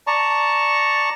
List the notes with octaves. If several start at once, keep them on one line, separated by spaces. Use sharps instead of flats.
D5 A5 A#5 C#6